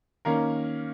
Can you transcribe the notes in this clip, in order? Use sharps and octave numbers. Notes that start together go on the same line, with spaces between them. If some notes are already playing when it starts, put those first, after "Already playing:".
D#3 A#3 C#4 A#4